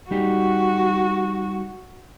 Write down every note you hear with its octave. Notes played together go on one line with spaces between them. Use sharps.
G3 D#4 F#4 G4